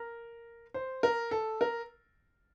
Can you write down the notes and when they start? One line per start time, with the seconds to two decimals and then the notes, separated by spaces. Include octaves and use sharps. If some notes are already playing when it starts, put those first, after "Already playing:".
Already playing: A#4
0.74 C5
1.03 A#4
1.31 A4
1.61 A#4